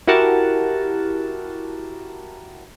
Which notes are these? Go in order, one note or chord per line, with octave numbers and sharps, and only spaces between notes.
E4 F#4 G4 A#4 F#5 A5